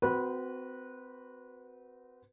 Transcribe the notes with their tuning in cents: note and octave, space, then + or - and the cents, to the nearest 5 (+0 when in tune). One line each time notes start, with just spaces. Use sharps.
C4 -30 F#4 +0 B4 -20